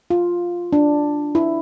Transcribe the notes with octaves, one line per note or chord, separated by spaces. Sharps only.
F4
D4
E4